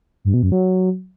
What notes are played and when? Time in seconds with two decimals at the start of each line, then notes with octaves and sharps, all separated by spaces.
0.25 G2
0.34 B2
0.43 F#2
0.52 F#3